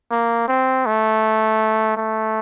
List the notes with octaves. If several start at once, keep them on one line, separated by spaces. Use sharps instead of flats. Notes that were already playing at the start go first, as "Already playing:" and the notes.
A#3
C4
A3
A3